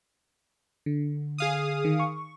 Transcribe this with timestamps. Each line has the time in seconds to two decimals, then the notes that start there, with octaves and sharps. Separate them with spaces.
0.86 D3
1.38 G#4 F5 D#6
1.85 D#3
2.00 C#6